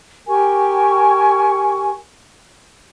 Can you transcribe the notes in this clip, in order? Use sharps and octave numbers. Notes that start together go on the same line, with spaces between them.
G4 A#4 G#5 C#6